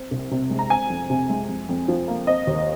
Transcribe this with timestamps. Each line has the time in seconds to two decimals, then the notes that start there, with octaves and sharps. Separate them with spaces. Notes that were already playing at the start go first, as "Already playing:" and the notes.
Already playing: C4
0.11 C2
0.31 C3
0.50 G#3
0.59 A#5
0.70 C4 G#5
0.90 F2
1.10 C3
1.30 G#3
1.49 F2
1.69 F2
1.88 F3
2.08 A#3
2.27 C4 D#5
2.47 D#2